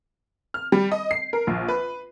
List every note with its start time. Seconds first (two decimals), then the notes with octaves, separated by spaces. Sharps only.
0.54 F6
0.72 G3
0.92 D#5
1.11 C7
1.33 A#4
1.47 A#1
1.68 B4